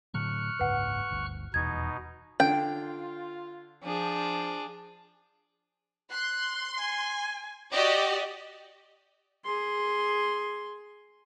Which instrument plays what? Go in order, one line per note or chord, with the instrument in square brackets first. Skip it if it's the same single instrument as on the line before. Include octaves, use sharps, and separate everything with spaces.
[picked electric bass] A2 D3 F#3 [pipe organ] C#6 F6 F#6
[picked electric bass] F#1 C#2 G#2 [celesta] B4 F#5
[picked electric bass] G1 D2
[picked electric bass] D#1 E2 [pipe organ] B2 D#4 [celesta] G#6
[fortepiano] D3 [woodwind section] F4 [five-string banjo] G5
[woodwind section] F3 [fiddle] D4 G#4
[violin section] C6 [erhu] F#6
[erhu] G#5
[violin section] F#4 G4 D5 [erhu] D#5
[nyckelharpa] G#4 C6